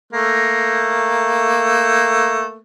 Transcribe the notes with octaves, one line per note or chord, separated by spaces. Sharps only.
A3 A#3